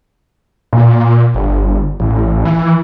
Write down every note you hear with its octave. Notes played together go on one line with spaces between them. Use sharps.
A#2
G1
A1
E3